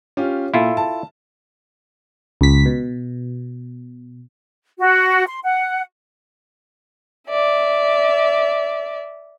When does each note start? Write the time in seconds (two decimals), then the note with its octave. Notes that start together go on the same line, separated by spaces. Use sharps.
0.17 C#4 F4 G4
0.54 A#2 E4 F4 A4
0.77 A5
2.41 C#2 B6
2.66 B2
4.79 F#4
5.27 C6
5.44 F#5
7.28 D5 E5